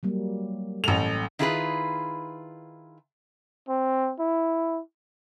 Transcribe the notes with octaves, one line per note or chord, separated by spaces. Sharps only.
F#3 G3 A#3
A1 A4 F7
D#3 E4 F4 G#4 A#4 B4
C4
E4